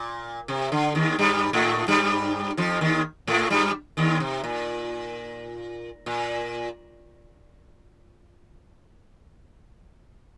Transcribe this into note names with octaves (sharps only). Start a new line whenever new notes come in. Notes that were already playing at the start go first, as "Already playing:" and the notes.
Already playing: A#2
C3
D3
D#2 D#3
G2 G3
A2 A3
G2 G3
F2 F3
D#2 D#3
A2 A3
G2 G3
D#2 D#3
C3
A#2
A#2